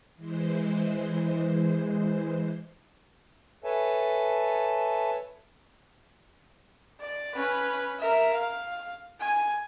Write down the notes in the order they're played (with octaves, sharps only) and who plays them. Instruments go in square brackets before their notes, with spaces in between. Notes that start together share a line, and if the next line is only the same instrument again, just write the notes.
[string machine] E3 G#3 C5
[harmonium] A4 B4 C#5 E5 G#5 A5
[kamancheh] D5
C#4 B4
A#4 E5
F5
G#5